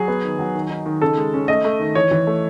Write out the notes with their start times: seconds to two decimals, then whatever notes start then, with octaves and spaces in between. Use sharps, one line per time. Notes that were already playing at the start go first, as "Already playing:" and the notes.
Already playing: F#3 G#4
0.08 B3
0.24 D#3
0.39 F#3
0.55 D#3
0.70 D#4
0.86 D#3
1.02 C#3 A4
1.17 G#3
1.34 C#4
1.48 A3 D#5
1.65 A3
1.80 D#3
1.95 E3 C#5
2.11 E3
2.27 A3